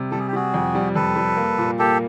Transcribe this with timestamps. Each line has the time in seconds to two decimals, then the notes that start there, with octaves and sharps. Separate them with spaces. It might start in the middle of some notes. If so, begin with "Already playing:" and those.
Already playing: C3 G3
0.11 G3 A4
0.19 G#4
0.27 G4
0.33 G3 F#4 G#4
0.54 F2
0.75 G3
0.95 F2 A4 B4
1.16 G3
1.37 A#3
1.58 A#2
1.79 A#3 G4 A4